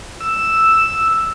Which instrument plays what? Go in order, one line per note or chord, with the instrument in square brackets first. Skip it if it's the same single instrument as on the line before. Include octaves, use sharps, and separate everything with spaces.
[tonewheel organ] E6